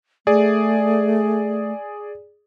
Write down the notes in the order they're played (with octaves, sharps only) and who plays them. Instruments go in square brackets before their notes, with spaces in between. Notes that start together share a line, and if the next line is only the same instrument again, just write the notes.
[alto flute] A3 [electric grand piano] G#4 D5